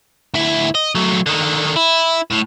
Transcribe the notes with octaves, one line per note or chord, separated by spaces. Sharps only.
D2 E4
D#5
F#3 A3
D3 D#3
E4
A2